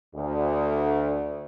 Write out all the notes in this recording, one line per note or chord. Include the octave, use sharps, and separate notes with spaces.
D2